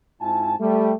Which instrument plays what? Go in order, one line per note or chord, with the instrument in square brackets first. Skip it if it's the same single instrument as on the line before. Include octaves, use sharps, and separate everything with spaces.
[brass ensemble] G#2 C4 E4 F4 G#5 A5
G3 A3